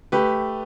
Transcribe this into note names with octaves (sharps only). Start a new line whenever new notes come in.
A3 G4 B4